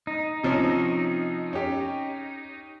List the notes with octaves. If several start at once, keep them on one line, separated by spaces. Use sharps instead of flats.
D#4
C3 F3 C#4
C#4 G4